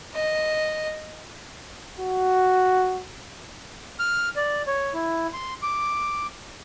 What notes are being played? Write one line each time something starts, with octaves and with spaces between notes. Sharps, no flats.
D#5
F#4
F6
D5
C#5
E4
C6
D6